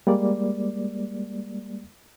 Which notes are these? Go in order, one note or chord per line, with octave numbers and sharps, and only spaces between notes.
G3 G#3 A#3 D5